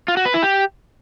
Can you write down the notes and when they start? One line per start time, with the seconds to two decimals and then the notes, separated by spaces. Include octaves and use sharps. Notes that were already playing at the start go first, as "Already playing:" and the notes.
0.08 F4
0.17 F#4
0.25 B4
0.34 E4
0.43 G4